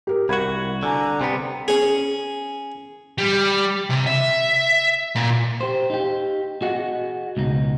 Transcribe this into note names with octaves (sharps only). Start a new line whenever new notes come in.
G4 A#4
C2 F#4 F#5 B5 G#6
D3 G#5 A#5
C3 G3 B3
C#4 G#4
G3
C3
E5
A#2
G4 C5
D#4 G4
F#4 G#4 D#5 F#5
C#2 B2 D#4